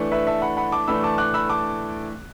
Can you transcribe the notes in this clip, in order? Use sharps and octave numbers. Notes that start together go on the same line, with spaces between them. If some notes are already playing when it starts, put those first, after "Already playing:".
Already playing: E3 A3 D4
B4 E5
E5 A5
F#5 B5
F#5 B5
A5 D6
A2 E3 A3 D4 B5 E6
A5 D6
D6 F#6
B5 E6
A5 D6